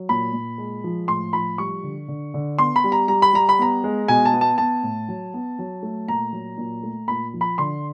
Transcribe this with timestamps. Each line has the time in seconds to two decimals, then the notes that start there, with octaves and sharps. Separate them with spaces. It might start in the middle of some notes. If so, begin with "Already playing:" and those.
Already playing: F#3
0.09 A#2 B5
0.33 A#2
0.58 G#3
0.84 F3
1.08 A2 C6
1.33 F3 B5
1.58 G3 C#6
1.83 D3
2.08 D3
2.34 D3
2.58 B3 C6
2.76 B5
2.84 G3
2.92 A#5
3.08 G3 A#5
3.22 B5
3.33 G3 A#5
3.49 B5
3.59 B3 A#5
3.84 G#3
4.08 B2 G#5
4.25 A5
4.34 B3
4.41 A5
4.58 B3 A5
4.83 A2
5.08 F#3
5.34 B3
5.59 F#3
5.83 A3
6.08 A#2 A#5
6.33 F#3
6.58 A#2
6.83 A3
7.08 A#2 B5
7.34 F3
7.41 B5
7.58 D3 C6